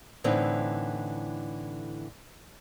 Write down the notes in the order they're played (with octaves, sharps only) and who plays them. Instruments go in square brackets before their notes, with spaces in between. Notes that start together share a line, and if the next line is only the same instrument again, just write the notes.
[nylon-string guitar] A2 D3 E3 C4 D#4